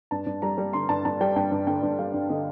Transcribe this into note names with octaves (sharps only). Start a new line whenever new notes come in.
G2 A5
G2
G3 A#5
G3
D3 C6
G2 A5
G2 A5
G3 G5
G2 G5
G2
D3 G5
G2
G3 F5
G2
D3 D#5